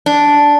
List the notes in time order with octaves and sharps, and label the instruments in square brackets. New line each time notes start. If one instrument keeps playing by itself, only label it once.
[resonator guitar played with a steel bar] D4